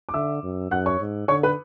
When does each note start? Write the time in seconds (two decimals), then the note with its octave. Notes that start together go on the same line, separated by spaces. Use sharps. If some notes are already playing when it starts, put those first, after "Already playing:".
0.09 D6
0.14 D3 E5 E6
0.43 F#2
0.71 F#2 F#5 F#6
0.86 C#5 C#6
0.99 G#2
1.28 D3 C#5 C#6
1.43 B4 B5